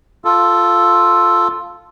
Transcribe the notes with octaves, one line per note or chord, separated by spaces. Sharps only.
F4 A4